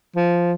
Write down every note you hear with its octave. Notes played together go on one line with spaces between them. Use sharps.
F3